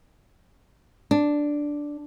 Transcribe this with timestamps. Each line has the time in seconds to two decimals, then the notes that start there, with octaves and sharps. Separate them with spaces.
1.11 D4